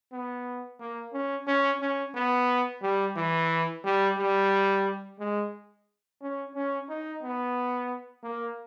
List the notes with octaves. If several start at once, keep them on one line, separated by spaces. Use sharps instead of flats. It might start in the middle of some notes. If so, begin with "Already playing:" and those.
B3
A#3
C#4
C#4
C#4
B3
G3
E3
G3
G3
G#3
C#4
C#4
D#4
B3
A#3